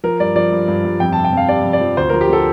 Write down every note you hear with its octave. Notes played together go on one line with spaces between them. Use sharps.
F3 A#4
G2 D5
F3 D5
G2
G2
G2
F2 G5
C3 A5
G5
F2 F5
C3 D5
F2
D5
F3
D2 C5
F3 A#4
G4
D3 A4